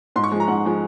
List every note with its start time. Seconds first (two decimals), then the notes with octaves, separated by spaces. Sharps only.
0.16 G#2 C6
0.24 C#6
0.32 F3 G#3
0.40 A#5
0.48 G#2 F#5
0.65 F3 G#3